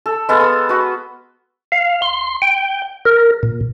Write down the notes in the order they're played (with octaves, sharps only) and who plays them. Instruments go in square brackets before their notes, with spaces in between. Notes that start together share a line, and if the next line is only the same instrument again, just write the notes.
[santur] A4
G#3 B3 A4 F5
D#6
F#4 B4
[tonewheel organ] F5
C6
G5
A#4
A#2